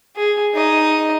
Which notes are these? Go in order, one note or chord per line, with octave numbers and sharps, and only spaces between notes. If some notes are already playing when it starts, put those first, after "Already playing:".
G#4
D#4 D#5